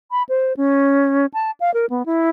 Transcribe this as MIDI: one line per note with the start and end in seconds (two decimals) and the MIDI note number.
0.11 0.23 83
0.29 0.56 72
0.57 1.26 61
1.34 1.51 81
1.60 1.73 77
1.74 1.86 70
1.90 2.05 59
2.06 2.30 64